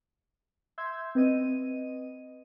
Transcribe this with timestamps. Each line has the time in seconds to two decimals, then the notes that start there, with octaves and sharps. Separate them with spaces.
0.78 E5 C6 E6 G6 G#6
1.15 C4 B4 D#5 D#7